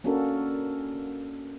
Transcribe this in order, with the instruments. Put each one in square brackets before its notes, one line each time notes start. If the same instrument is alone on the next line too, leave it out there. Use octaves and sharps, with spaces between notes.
[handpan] A#3 C#4 D4 F#4 A4 A#4